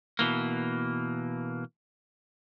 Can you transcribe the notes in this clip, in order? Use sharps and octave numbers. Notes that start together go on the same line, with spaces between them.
B2 E3 A#3